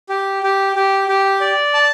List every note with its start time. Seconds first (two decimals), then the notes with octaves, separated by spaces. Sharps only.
0.09 G4
0.43 G4
0.76 G4
1.08 G4
1.41 D5
1.74 A5